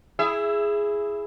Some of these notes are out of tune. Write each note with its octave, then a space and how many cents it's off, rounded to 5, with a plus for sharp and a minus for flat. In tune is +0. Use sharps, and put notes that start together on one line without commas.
E4 +0 G#4 +0 E5 +20